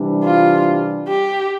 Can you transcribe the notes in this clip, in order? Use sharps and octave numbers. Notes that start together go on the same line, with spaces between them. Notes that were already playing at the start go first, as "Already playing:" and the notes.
Already playing: C3 E3 G3 D4
F4
G4